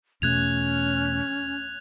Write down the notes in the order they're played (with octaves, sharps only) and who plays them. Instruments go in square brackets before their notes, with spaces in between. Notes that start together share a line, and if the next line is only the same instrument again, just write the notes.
[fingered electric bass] E2 B2 A3 [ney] C#4 [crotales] F#6 G#6 F7